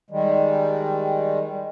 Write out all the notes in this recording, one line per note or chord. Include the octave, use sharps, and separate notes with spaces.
D#3 G3 G#3